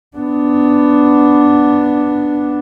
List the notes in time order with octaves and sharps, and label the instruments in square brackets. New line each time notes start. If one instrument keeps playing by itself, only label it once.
[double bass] B3 D4